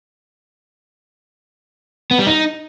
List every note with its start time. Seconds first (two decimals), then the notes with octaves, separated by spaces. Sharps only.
2.11 B3
2.19 G3
2.27 D#4